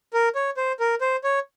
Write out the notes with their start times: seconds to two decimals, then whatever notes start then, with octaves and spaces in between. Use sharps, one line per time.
0.13 A#4
0.35 C#5
0.57 C5
0.80 A#4
1.01 C5
1.24 C#5